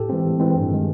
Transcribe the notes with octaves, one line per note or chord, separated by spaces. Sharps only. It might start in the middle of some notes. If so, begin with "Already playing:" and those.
Already playing: A2 G4 A4
E3 G#3 C4
A2
E3 G#3 C4
G2
D#3 G#3